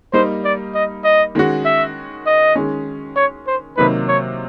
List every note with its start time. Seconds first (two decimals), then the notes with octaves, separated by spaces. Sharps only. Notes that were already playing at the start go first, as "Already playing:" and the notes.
0.13 G3 A#3 D#4 C5
0.44 D5
0.75 D#5
1.04 D#5
1.35 D#3 G#3 C#4 F#4
1.65 E5
2.26 D#5
2.56 D#3 G#3 C#4
3.16 C#5
3.47 C5
3.77 C3 D#3 F#3 A#3 D#4 B4
4.08 C#5